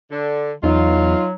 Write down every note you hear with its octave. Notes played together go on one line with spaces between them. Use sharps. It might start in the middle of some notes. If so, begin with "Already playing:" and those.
D3
E2 F#3 D#4 F4